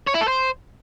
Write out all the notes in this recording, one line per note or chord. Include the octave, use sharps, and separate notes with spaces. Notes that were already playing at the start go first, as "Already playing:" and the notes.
C#5
E4
A4
C5